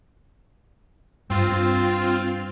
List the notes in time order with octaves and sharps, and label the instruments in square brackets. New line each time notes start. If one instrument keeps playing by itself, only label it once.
[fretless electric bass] G2 [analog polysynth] C4 F4